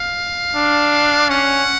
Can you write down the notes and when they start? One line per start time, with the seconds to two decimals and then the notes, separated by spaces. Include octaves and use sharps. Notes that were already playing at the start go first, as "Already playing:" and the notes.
Already playing: F5
0.55 D4
1.30 C#4 F#5